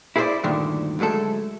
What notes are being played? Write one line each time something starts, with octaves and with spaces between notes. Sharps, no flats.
E4 G#4 A4 B4 C5 D5
D2 G2 A#2 D3 D#3
D2 F#3 G#3 A3 A4